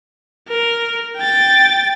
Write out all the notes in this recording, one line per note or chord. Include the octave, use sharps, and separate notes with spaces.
A#4
G5 A6